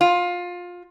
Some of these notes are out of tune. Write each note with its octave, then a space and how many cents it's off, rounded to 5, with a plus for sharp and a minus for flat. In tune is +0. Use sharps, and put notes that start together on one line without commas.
F4 +20